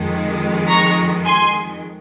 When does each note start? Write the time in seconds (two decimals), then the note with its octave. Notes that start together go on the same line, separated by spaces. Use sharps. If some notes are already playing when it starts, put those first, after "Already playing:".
Already playing: F2 D#3 G#3
0.68 A#5 C#6
1.25 G#5 C6